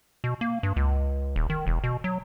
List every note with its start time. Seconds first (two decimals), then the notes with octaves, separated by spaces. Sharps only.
0.24 B2
0.41 A#3
0.63 G2
0.76 C#2
1.36 D#1
1.50 D#3
1.67 E1
1.84 B2
2.04 F#3